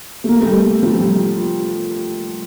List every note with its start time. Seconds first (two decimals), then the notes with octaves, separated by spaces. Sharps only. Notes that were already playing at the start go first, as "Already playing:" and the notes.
0.24 A3
0.29 A#3
0.42 A3
0.46 G3
0.83 F3
1.01 G3